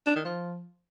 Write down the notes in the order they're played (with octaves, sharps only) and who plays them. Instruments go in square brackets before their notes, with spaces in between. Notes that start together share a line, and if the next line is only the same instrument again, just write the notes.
[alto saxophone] D4
D#3
F3